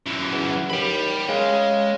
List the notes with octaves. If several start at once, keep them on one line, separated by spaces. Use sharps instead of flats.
F#2 E3
E2
D#2 G5 B5
C#3 G#3